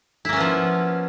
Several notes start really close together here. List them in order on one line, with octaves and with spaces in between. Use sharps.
E4 A#3 C#4 B3 F3